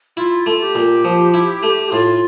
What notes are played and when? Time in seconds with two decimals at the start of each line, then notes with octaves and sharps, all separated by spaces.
0.17 E4 F4
0.46 A3
0.61 G4
0.75 A#2
1.04 F3
1.34 E4
1.63 A3
1.87 G4
1.92 A2 F4